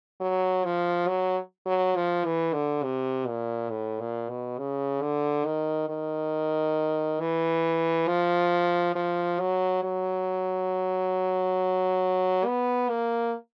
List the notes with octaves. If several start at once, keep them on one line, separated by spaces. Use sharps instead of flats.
F#3
F3
F#3
F#3
F3
E3
D3
C3
A#2
A2
A#2
B2
C#3
D3
D#3
D#3
E3
F3
F3
F#3
F#3
B3
A#3